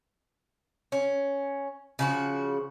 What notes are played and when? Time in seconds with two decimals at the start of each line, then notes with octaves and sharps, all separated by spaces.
0.92 C#4
1.99 C#3 F3 F#4